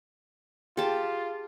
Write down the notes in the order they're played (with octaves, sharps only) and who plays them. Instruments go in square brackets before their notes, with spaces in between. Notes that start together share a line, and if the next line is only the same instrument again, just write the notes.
[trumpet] F4 [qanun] G4 A5 [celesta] G#4